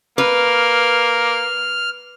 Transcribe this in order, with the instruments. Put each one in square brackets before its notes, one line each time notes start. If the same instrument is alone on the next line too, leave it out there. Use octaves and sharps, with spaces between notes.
[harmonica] A#3 [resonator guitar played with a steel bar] B4 [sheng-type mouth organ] F6